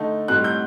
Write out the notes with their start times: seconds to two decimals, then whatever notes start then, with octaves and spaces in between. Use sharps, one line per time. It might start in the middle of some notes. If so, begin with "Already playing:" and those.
Already playing: D3 A3 D#4
0.28 A2 G3 C4 D#4 F#6
0.44 G6